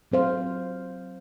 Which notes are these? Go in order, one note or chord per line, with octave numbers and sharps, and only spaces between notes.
F#3 C4 C5 F5